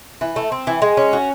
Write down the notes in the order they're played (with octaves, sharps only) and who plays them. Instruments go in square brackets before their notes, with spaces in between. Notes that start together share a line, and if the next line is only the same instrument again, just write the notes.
[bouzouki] E3
A3
C4
E3
G#3
C#4
F#4